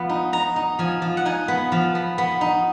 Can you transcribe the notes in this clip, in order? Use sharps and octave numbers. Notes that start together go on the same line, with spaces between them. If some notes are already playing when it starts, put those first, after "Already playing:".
Already playing: F3 B3
D#4
D#4 A#5
D#4
F3 G#5
F3
F#5
D#4 G#5
B3
F3
B3
B3
D#4